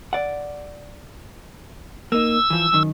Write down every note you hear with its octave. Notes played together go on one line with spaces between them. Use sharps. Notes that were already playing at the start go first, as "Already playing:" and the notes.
D5 F#5
A#3 D#4 E6
E3 F3
F#2 D#3